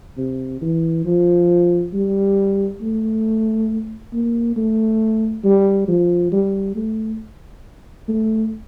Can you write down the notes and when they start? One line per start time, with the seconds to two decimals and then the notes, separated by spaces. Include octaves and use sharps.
0.17 C3
0.61 E3
1.05 F3
1.93 G3
2.81 A3
4.13 A#3
4.56 A3
5.44 G3
5.88 F3
6.32 G3
6.76 A3
8.08 A3